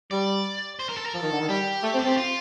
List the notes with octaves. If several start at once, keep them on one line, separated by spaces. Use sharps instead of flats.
G3 D5
C5
A#4
A4
A#4
F3 A4
D#3
D3
D#3
G3 G4
A3
C4
A4
C4 G4
F4